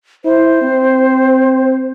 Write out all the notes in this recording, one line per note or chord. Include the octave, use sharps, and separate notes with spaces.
E4 C5
C4